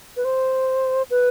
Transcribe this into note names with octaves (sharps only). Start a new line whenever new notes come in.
B4
C5
B4